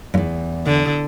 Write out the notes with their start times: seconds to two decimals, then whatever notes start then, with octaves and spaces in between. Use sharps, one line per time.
0.14 E2 G2
0.66 D3